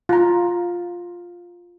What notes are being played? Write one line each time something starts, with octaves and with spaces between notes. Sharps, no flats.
F4 A#5